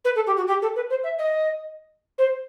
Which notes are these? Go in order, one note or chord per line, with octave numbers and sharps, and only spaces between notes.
B4
A4
G4
F#4
G4
A4
B4
C5
E5
D#5
C5